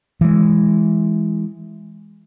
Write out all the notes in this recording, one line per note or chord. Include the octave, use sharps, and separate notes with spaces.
E3 G#3